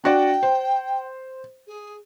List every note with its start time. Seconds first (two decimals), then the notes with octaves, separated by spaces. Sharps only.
0.04 D4 F#4 D5 G5
0.43 C5
1.67 G#4